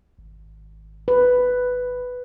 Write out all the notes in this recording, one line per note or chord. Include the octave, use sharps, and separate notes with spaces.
G#1
B4